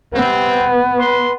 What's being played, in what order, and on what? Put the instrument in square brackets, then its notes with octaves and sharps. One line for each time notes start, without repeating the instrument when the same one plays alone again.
[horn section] C3 G3 C4 [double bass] B3
[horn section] B4 C6